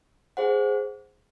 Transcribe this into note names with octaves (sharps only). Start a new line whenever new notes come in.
G#4 C5 F#5